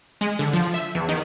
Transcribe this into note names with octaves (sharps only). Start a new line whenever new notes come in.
G#3
D3
F3
E5
E2
D#3